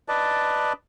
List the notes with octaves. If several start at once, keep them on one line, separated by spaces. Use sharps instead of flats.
B4 D5 D#5 A5